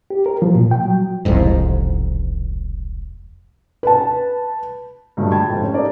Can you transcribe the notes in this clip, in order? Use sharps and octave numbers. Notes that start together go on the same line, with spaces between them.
G4
A#4
F3
A#2
G5
F#3
E1 C2 F2 G#2
B4 A5
G2 A#2 D3 F#3 G#3 A3
G5 A5 B5 G#6
F1 G#2
C#4
D#4 G4 A4 A#4 D5